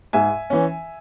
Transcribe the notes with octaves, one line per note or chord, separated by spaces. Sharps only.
G#2 E5 G#5
E3 C#4